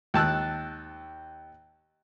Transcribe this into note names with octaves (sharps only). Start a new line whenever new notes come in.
D#2 A5 E6 F#6